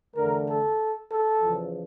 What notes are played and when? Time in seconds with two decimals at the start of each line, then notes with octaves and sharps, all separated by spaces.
0.15 E2 D3 A3 A#4
0.48 A4
1.11 A4
1.41 E2 C#3 F3